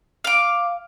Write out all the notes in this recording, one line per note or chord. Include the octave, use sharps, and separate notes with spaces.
F5 D6